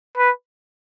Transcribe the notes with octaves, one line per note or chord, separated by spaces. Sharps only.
B4